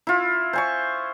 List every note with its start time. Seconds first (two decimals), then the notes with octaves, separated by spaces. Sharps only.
0.07 E4 F4
0.53 C5 G#5 C#6